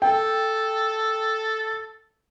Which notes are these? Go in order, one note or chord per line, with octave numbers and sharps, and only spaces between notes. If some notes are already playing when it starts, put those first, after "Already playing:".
A4 G5